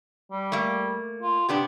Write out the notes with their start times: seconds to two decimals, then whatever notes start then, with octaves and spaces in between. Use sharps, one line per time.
0.32 G3
0.52 A3 A#3
1.23 F4
1.49 C3 B3 D4 G4